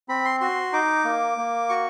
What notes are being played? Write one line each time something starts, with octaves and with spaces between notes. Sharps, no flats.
C4 B5
C6
F#4 C6
D#4 D6
A#3
A#3
F#4 C#6